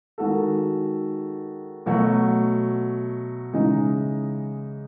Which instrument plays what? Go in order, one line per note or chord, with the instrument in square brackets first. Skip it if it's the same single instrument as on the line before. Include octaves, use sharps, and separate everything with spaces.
[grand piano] D#3 G#3 D#4 F#4 A4
B2 F#3 A3
C#3 E3 G#3 D#4